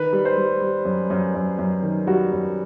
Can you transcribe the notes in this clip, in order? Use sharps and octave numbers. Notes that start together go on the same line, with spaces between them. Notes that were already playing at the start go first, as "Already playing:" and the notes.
Already playing: D#3 B4
G3
C5
G3
G3
F#2
F#2
F#2
F#2
D#3
G3 F#4
F#2